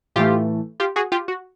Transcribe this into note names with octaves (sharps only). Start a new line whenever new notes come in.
A2 E3 A3 F4 G4
F4 G4
F#4 G#4
F4 G4
F#4